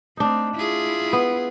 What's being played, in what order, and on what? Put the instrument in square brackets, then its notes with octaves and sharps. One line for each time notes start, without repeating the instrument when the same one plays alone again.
[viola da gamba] A3 C4 [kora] D4 D#4
[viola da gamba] E4 F4 G#4
[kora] B3